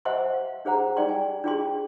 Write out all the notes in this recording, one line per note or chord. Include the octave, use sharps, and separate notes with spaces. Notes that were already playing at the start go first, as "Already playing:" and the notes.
C5 D#5 E5 F#5 G#5 C6
F5
D4 G#4 C5 F#5 A#5
D#4 D5 G5 C6
G#5
D4 F4 G#4 G5 G#5 C6